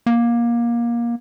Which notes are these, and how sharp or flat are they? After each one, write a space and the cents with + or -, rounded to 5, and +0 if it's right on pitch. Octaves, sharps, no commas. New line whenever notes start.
A#3 +20